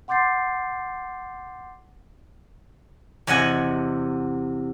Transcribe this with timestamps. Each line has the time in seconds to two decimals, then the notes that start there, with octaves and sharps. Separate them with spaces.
0.08 F#5 C6 D6 G6 A6 C7
3.27 E2 C3 D#5 F#5 G#5